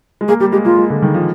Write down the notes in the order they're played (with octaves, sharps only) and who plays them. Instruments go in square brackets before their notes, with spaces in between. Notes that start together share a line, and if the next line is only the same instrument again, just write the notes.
[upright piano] G#3
[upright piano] A#3 [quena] G#4
[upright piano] G3 [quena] G4
[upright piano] G#3 [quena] G4
[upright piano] A#3 [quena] F4
[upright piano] G#3
D3
D#3
F3